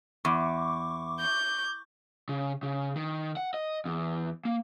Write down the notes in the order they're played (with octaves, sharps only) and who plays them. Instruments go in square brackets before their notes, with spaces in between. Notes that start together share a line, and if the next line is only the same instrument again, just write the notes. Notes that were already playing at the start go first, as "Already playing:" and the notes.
[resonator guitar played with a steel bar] E2 [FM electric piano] C#6 D6
[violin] G6
[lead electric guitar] C#3
C#3
D#3
F#5
D#5
E2
A#3